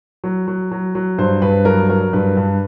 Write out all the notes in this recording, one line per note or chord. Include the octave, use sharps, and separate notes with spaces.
F#3
F#3
F#3
F#3
G2 C5
G2 B4
F#3 A#4
F#3 A#4
G2 B4
G2